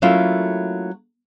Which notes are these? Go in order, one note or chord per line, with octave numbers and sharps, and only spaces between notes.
F#3 A3 A#3 C#4 E4 F4